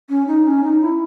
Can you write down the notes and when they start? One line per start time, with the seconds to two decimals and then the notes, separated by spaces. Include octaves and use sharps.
0.10 C#4
0.27 D#4
0.45 C#4
0.64 D#4
0.81 E4